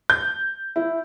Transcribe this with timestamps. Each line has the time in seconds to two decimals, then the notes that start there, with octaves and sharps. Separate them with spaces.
0.10 G6
0.76 E4